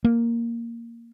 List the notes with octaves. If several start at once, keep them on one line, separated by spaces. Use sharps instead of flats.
A#3